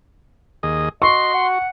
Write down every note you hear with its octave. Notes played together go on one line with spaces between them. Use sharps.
D#2 G#4 D#5
F#4 D#5 C6 C#6
F#5